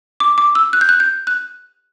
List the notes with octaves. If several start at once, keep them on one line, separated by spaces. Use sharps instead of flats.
D6
D6
E6
F#6
G6
F#6
G6
F#6